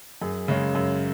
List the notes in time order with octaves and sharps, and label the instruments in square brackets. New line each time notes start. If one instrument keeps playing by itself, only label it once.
[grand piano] F#2 G#4
C#3 G#3 C#4
F#2